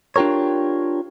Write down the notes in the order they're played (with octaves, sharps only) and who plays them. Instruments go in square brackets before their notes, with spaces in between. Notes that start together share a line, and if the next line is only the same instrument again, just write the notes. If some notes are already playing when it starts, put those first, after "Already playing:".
[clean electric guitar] D4 F4 G4 A#4 C#5